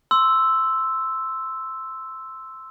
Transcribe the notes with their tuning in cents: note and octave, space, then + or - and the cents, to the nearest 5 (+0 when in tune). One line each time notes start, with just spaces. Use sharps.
C6 +0 E6 +0